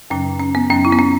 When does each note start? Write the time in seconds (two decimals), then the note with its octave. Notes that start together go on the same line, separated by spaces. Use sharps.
0.10 F#2 C#3 F#3 C#4
0.39 C#4
0.55 B3
0.70 F#2 F#3 C#4
0.85 E4
0.92 B3
0.99 C#4